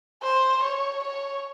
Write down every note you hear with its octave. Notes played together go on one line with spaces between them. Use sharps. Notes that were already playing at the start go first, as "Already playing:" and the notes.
C5
C#5
C#5